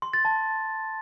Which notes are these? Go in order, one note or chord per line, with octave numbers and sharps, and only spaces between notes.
C6
A6
A5